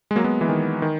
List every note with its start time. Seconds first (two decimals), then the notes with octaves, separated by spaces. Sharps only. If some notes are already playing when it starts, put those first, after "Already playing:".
0.11 G#3
0.16 F#3 A#3
0.24 G#3 B3
0.41 E3 G#3
0.49 D#3
0.82 D#3